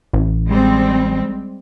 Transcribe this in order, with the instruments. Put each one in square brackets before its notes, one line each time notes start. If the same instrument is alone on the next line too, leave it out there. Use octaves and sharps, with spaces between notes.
[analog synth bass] A1
[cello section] G3 G#3 C4